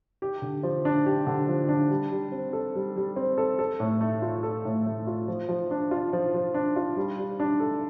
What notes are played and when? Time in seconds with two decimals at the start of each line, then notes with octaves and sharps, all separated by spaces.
0.22 G4
0.42 D3
0.63 F3
0.85 D4
1.06 G4
1.27 D3
1.48 F3
1.69 D4
1.91 G3
2.11 G3
2.32 C4
2.53 A4
2.75 G3
2.96 G3
3.16 C4
3.38 A4
3.59 A4
3.80 A2
4.01 A3
4.22 F4
4.43 A4
4.65 A2
4.86 A3
5.07 F4
5.28 F3
5.49 F3
5.71 D4
5.91 F4
6.13 F3
6.34 F3
6.54 D4
6.76 F4
6.97 G3
7.18 G3
7.40 D4
7.60 A4